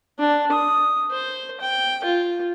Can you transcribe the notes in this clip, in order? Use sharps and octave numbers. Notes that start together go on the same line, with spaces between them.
D4
D#6
C5
G5
F4